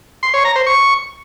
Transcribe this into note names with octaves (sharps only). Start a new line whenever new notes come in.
C6
C#5
A#5
C5
C#6